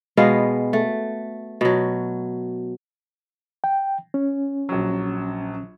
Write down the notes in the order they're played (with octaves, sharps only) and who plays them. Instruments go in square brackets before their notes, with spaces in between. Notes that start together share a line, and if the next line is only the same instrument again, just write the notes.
[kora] B2 G#3 B3 F5
A3
B2 F#3
[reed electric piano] G5
C#4
[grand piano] A#1 F#3